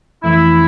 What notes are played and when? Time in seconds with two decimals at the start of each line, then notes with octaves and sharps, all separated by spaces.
0.23 F2 E3 A3 E4